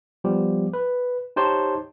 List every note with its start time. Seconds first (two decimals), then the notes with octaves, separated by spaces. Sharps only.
0.24 F3 G3 B3 G4
0.73 B4
1.36 D#4 G4 C5 C#5 A5 C6